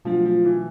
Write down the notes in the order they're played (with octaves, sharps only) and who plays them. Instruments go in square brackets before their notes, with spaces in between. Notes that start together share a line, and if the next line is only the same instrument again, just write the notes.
[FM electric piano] B2 F#3 A3 D4 F#4 [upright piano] F3
[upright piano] F3
E3